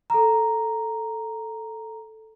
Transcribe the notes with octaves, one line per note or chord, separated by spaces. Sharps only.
A4 A#5